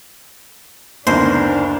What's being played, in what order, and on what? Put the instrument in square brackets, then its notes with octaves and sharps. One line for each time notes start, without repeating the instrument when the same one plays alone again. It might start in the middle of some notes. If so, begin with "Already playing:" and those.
[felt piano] F#1 D2 B3 [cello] D4 [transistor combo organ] D#4 A#4 [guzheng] C5